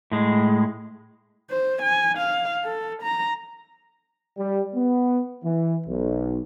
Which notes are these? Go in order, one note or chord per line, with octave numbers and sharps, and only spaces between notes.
A2 G#3
C5
G#5
F5
A4
A#5
G3
B3
E3
B1